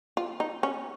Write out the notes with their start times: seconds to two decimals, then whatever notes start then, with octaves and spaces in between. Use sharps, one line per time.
0.17 F4
0.40 D#4
0.63 C#4